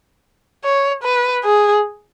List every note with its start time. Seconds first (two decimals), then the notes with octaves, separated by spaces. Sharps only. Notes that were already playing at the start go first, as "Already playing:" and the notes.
0.64 C#5
1.04 B4
1.44 G#4